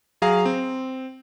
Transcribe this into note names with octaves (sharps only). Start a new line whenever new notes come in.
F#3 G#4 F5 A#5
C4